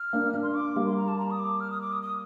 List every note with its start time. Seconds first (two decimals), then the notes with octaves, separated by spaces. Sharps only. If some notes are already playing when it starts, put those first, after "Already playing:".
Already playing: F6
0.13 A#3 D4
0.34 A#3 D4
0.43 C6
0.55 D6
0.76 G3 A#3
0.87 C6
0.97 A#5
1.08 A5
1.19 A#5
1.30 D#6
1.39 D6
1.60 F6
1.71 D#6
1.81 D6
1.92 D#6
2.02 D#6